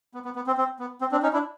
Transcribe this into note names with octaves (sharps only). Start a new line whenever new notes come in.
B3
B3
B3
C4
C4
B3
C4
C4 D4
C#4 D#4
D4 E4